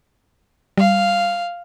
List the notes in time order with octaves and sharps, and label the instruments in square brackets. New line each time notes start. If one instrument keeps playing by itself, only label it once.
[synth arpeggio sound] G3 [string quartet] F5